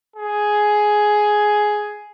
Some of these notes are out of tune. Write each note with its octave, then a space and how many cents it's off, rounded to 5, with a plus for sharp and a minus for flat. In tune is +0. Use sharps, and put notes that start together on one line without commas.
G#4 +10